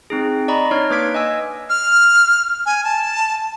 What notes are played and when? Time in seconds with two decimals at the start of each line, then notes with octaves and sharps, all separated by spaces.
0.10 C4 D#4 G#4
0.48 D5 D#5 A#5 B5 C#6
0.71 D4 D#4 C#5 F6
0.90 A#3 B4 D6 G#6 B6 D7
1.15 D#5 G#5 E6
1.69 F6
2.66 G#5
2.84 A5